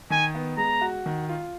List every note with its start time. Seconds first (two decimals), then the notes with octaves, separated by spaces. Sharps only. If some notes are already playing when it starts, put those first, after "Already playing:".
0.10 D#3 G#5
0.35 B3
0.58 G#3 A#5
0.81 F#4
1.06 D#3
1.29 F4